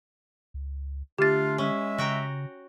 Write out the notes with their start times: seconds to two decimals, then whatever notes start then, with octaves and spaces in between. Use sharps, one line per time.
0.54 C#2
1.18 D3 A3 D4 F4 G4 A6
1.58 G#3 C#4 E5
1.98 C#3 F#4 G5 A#5